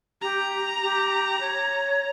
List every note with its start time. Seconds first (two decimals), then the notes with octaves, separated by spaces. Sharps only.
0.22 G4 A#5
0.83 G4
1.40 C#5